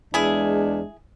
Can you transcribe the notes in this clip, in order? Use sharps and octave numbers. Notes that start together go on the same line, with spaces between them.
E2 G#3 D4 E4 G#4